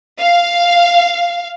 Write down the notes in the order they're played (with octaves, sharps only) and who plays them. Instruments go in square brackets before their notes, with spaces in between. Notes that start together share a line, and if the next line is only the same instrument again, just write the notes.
[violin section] F5